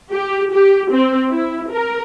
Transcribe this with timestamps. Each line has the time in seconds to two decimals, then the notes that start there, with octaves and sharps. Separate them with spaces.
0.11 G4
0.52 G4
0.91 C4
1.30 E4
1.72 A#4